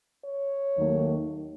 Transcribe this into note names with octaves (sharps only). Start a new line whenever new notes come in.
C#5
D#2 D#3 F#3 A3